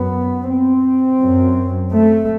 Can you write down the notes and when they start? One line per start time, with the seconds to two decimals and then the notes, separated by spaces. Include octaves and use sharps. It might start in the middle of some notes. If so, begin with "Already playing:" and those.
Already playing: F#2 B3
0.47 C4
1.19 F#2
1.91 A3